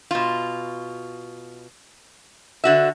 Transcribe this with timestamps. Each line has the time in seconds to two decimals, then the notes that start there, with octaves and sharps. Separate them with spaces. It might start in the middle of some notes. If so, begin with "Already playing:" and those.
0.11 B2 F4
2.64 D3 F#4 E5